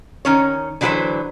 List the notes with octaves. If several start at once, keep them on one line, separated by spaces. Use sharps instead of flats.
D#3 C#4 C#5
D3 E3 F#3 F#4 B4 C5